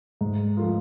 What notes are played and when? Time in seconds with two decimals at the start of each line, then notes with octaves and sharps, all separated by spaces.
0.21 G#2
0.57 F3 A3 F4